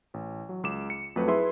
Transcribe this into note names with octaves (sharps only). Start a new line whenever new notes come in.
A1
F#3
C#2 D6 E7
C#7
F2 F#3 A3 B4
E4 G#4 B4 E5 C6